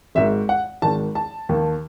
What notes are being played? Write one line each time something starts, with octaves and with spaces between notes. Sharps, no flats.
G#1 G#2 D#3 E5
F#5
G#1 G#2 D#3 A5
A5
D#2 D#3